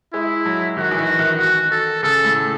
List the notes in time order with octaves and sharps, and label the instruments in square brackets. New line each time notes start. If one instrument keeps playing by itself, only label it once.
[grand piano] G#3 [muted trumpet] E4
[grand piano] F#3
[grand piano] D#3 [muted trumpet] F#4
[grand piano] E3
D#3
D#3
[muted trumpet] F#4
A4
[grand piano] C#3 [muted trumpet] A4
[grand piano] A2